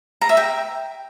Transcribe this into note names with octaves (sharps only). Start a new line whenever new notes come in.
A#5
E5
G5